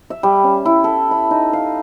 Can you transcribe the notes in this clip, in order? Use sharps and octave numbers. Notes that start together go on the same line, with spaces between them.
E5
G3
C#4
E4
A4
B5
D#4
F5